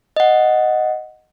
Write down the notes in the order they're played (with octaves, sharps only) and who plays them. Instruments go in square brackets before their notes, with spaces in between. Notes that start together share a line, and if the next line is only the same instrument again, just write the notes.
[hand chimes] D#5 F#5